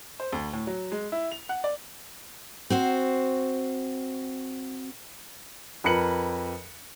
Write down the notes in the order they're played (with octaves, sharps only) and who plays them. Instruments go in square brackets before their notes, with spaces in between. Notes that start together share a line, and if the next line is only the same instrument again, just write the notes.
[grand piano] C5
D2
A2
F#3
G#3
E4
F7
F#5
D5
[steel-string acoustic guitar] C4 F#4 C5
[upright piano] F2 A#4 B4 C#7 F#7